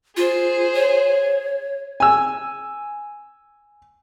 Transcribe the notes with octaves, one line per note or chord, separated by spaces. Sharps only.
F4 G#4 C5
C#5
G#5 E6